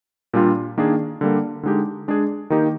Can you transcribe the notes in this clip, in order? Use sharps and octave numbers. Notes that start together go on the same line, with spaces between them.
A#2 G3 D4 F4
D#3 A#3 D4 G#4
D3 G3 A#3
D3 G#3 D#4 G4
G#3 D4 G#4
D#3 A#3 D#4 G4